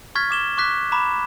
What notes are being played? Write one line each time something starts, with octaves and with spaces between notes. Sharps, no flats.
C#6 F6 G#6 A6 B6
D6 E7 G7
C#6 D6 F#6 B6
A#5 B5 D6 E7